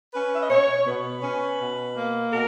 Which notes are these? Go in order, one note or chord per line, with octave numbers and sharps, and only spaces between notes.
C#4 B4
E5
D#5
B2 C#5
B2 B4
C#4
B2
A#3
B2 A#4